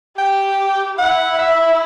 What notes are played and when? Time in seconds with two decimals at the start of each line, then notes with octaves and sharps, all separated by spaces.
0.18 G4 G5
0.98 E4 F#5
1.39 E5